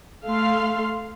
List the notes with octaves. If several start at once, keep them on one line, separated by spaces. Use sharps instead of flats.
A3 F5 C6